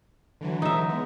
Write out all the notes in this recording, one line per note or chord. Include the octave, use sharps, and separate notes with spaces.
D3 E3 F#3
D#4 E5
G#3 B3